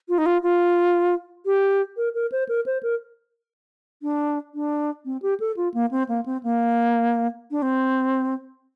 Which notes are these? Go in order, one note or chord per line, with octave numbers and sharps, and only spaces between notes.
F4
D#4
F4
F4
G4
A#4
A#4
C5
A#4
C5
A#4
D4
D4
C4
G4
A4
F4
A#3
C4
A#3
C4
A#3
D4
C4